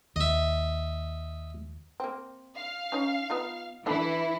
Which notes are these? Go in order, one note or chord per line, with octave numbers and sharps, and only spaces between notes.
D#2 D#5 E5
A#3 C4
F5
C#4 D#4 C#5
B3 D#4 F4
E3 D4 E4 A4 E5